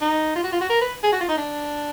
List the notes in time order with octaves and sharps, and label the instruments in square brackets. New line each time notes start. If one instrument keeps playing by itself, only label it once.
[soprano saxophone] D#4
F4
F#4
F4
F#4
A#4
B4
G#4
F#4
F4
D#4
D4